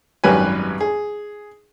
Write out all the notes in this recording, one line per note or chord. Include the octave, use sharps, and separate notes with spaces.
G#1 F#2 G3 G4 B4 G#5
G#4